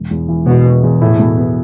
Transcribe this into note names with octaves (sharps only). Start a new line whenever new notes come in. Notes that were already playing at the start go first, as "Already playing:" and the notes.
Already playing: E1
E2
E3
E1 B2
E1
E2
A2 E4
B2
B3